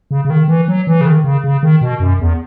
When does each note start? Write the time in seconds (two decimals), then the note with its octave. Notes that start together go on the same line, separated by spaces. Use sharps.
0.11 C#3
0.25 C#3
0.30 D#3
0.48 E3
0.68 F#3
0.87 E3
1.01 C#3
1.06 D#3
1.24 C#3
1.44 C#3
1.63 D#3
1.81 B2
2.00 F#2
2.20 E2